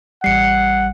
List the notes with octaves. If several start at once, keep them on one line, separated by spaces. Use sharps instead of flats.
A1 G3 F#5 C7 C#7